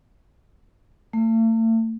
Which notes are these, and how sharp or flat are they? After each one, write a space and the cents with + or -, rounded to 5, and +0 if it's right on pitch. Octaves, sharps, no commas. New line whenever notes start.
A3 +40